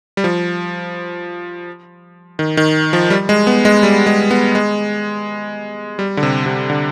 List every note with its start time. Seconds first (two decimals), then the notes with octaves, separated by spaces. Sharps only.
0.17 G3
0.24 F3
2.39 D#3
2.57 D#3
2.93 F3
3.10 G3
3.29 G#3
3.47 B3
3.65 G#3
3.83 G3
4.07 G#3
4.31 B3
4.55 G#3
5.99 G3
6.17 D3
6.23 C3
6.46 C3
6.70 D3